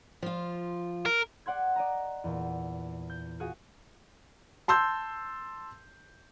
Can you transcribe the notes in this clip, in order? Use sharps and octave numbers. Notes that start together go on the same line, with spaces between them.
F3 F4
A#4
D5 F#5 C6 G#6
D5 D#5 A#5
E2 A#2
G6
F4 F#4 G#4
A5 C6 E6 G6